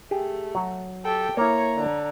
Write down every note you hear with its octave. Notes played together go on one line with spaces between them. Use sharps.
A3 G4 G#4
F#3 F#4
G4 A4 G5
A#3 E4 C#5 A#5
D3